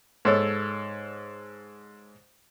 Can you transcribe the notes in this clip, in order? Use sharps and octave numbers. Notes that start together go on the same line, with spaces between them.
G#2 A4 C#5